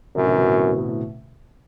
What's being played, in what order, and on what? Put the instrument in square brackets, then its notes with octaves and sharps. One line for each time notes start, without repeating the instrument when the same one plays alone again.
[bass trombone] F#2 [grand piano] A2 C3
[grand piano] B2 D3
B2 D3
A2 C3
B2
B2
A2